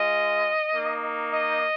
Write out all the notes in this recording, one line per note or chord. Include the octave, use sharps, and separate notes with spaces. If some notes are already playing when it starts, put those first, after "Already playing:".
Already playing: G#3 F4 D#5
A#3 D#4
D#5